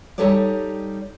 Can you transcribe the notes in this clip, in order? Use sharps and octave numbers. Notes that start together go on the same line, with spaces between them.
G3 D#4 G4 A4 C#5 D5